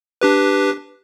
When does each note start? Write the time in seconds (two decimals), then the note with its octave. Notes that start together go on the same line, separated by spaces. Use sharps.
0.21 D4 G4 B4